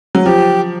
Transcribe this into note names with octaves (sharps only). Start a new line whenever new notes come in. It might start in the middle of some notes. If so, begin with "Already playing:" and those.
F#3
F3 G4